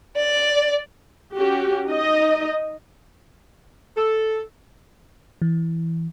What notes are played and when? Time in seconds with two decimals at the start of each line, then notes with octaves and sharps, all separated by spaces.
0.17 D5
1.36 C#4 F#4 G4
1.88 D#4 D#5
3.97 A4
5.42 E3